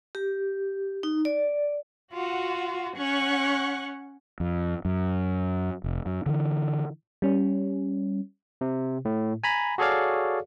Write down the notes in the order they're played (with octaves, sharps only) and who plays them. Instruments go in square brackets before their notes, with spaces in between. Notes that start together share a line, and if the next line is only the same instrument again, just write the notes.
[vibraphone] G4
D#4
D5
[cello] F4 [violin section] F#4
[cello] C#4 [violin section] F#5 C#6 F#6
[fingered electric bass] F2
F#2
F1
F#2
D3 E3
[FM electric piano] G3 C#4
[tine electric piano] C3
A2
G#5 A#5 B5
F#4 G#4 A4 C#5 D5 F5